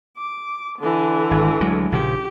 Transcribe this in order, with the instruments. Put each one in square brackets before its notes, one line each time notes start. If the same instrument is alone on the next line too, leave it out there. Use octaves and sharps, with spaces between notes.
[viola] D6
D3 E3
[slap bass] G#1
D2 F#3 G#3
[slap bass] A#1 C#3 F3 [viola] G4